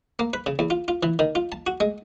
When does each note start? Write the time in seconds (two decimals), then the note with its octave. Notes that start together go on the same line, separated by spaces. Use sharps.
0.19 A#3
0.33 B4
0.46 C#3
0.59 E2
0.70 F4
0.88 F4
1.03 E3
1.19 D#3
1.35 F4
1.52 A5
1.67 F#4
1.80 G#3